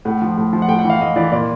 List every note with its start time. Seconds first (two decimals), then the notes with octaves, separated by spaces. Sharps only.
0.05 A2 F#5
0.22 F3
0.38 A2
0.53 F3
0.62 F#5
0.68 A2 G5
0.79 F#5
0.84 E3
0.90 F5
1.00 A2 D#5
1.16 E3 D5
1.32 A#2 D5